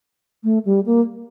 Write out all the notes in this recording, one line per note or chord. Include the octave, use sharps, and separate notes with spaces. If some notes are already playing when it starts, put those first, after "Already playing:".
A3
G3
A#3